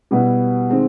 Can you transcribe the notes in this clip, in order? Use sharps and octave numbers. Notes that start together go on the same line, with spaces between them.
B2 G3 B3 E4
D#3 G#3 C4